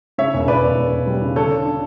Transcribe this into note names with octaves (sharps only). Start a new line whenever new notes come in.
C#3 C#5 E5
E1
E1 B4 D5
E1
E1
E1
G3
C#3
D3 A4 C#5
D4
D4